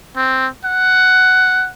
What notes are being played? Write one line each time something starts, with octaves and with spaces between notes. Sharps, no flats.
C4
F#5